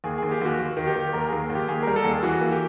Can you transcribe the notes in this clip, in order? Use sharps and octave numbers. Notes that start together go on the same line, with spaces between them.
D#2 G#4
D#2 G#4
G4
D#2 F#4
D#2
D#3
G4
D#3
D#2 A#4
D#2 G#4
D#2
G4
D#2 G#4
G3 A#4
A4
D#2
G#4
E3 F#4
A#3
G4